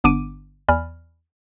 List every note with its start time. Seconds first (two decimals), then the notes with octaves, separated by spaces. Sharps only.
0.04 G1 B3 D4 D6 D7 D#7
0.68 E2 D5 G#5 B5 F6